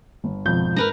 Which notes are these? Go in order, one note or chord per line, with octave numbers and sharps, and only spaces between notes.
G1
G#1 F2 B2 F3 F4 G6
G#2 A#4 B4 A#5